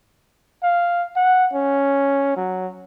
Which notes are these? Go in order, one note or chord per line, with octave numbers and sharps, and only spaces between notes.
F5
F#5
C#4
F#3